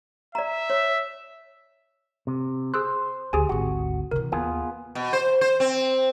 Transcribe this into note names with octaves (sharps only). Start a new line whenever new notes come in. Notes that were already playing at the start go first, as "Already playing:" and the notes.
D5 E5 A#5
C#5
C3
G#4 C5 E6 F#6
D2 G4 G#4 G#5
G#1 D2 F#4
C3 E3 A#4
D#2 B3 F4 G#4
B2
C5
C5
C4